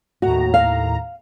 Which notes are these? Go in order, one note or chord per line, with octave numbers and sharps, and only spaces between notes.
D#2 A2 F#4 A#5
F5